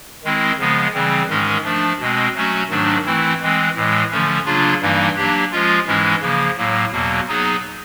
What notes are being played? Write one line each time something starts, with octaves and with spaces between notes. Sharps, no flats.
D#3 G#3 C4 E4
C#3 F3 G#3 B3
C#3 E3 G3 C4
G#2 D#3 G#3 C#4
F3 A3 D4
B2 G#3 C4
F#3 A3 C#4 F#4
G#2 D#3 F#3 A3 D4
E3 A3 C4 E4
E3 G#3 C4
A2 E3 G#3
D3 F3 A3 C#4
C#3 F#3 A#3 D4 F4
G2 E3 G3 A#3 D#4
F#3 A#3 D4 G4
F3 G#3 C#4 F4
G#2 E3 G#3 C#4 E4
C#3 F3 A#3
A2 F#3 A#3
E2 B2 F#3 A#3
F#3 B3 D#4 G#4